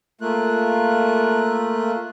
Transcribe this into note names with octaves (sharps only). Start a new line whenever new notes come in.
A3 A#3 F4 F#6